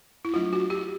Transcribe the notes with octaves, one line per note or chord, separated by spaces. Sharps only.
E4
F#3 A3 D4 F4
F#4
G4